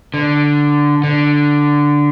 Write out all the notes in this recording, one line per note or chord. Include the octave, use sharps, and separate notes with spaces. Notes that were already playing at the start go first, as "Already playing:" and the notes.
D3
D3